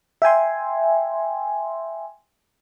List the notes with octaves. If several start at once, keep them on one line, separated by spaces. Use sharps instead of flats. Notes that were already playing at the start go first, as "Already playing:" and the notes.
E5 G5 G#5 C6